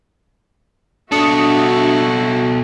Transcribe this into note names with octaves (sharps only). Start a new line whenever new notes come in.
B2 D4 F#4 A4 E5 D#6 C#7